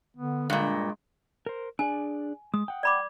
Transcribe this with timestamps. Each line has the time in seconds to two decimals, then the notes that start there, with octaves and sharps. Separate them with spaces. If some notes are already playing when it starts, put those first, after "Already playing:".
0.17 D3 B3
0.50 G2 A#2 G#3
1.46 A#4 C5
1.79 D4 G#4 D5 G#5
2.54 G#3 D#6
2.68 F#5 G5
2.83 D5 B5 D6